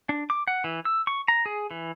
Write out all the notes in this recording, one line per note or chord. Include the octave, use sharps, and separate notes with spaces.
D4
D6
F#5
E3
E6
C#6
A#5
G#4
E3